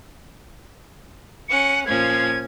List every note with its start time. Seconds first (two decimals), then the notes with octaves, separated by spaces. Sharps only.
1.49 C#4 F#5 C#7
1.86 A#2 F3 C#4 G#6